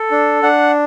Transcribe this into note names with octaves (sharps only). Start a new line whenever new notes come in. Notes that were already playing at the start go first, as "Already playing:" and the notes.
Already playing: A4
D4
D4 F#5